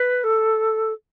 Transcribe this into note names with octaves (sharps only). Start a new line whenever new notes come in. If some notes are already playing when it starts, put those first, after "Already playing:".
Already playing: B4
A4